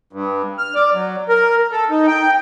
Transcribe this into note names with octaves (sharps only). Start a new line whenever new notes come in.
G2
F6
D5
F#3
A#4
A4
D#4
G5